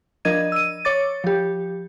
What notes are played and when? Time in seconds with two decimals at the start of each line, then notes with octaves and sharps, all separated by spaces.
0.25 F3 D4 A#4 D#5 G#6 D#7
0.52 E6 D#7
0.85 C#5 D6 A6
1.24 F3 G4